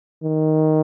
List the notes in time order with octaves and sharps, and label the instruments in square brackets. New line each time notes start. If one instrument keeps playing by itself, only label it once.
[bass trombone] D#3